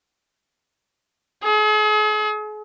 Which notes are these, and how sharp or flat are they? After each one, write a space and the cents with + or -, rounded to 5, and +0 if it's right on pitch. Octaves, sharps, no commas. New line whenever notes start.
G#4 +40